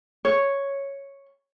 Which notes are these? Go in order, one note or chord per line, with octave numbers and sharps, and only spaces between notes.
C#5